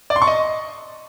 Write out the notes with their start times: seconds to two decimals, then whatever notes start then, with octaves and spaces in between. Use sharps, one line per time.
0.10 D5
0.16 C6
0.22 C#6
0.27 D#5